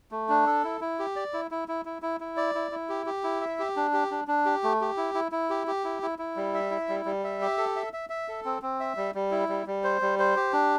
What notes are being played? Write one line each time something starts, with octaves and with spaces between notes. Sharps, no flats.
A3
D4
A4
E4
E4
G4
D5
E4
E4
E4
E4
E4
E4
D5
E4
E4
G4
G4
E4
E5
G4
D4
G4
D4
D4
G4
A3
G4
E4
E4
E4
G4
G4
E4
E4
E4
G3
E5
E4
G3
G3
E5
G4
A4
E5
E5
E5
A4
C4
C4
E5
G3
G3
E4
G3
G3
C5
G3
C5
G4
D4